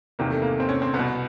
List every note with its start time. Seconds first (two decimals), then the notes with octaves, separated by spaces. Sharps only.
0.19 E2 C3 D#3 A#3
0.30 A3
0.42 A#3
0.60 C4
0.69 C#4
0.82 C4
0.94 C2 B3
0.99 B2